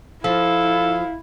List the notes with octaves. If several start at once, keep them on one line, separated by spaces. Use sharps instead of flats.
F3 E4 A4 F5